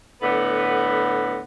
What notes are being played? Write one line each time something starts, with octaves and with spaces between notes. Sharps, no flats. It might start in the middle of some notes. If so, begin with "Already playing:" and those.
A2 D3 B3